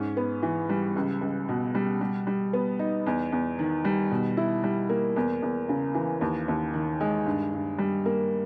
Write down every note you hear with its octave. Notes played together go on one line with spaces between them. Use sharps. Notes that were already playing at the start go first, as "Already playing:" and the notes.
Already playing: G#2 C#4
B3
E3
G3
C#2
C#2
B2
G3
G3
G3
B3
D#4
E2
E2
D#3
G3
B2
E4
G3
A#3
E2
E2
C#3
E3
D#2
D#2
D#3
G#3
G2
G2
G3
A#3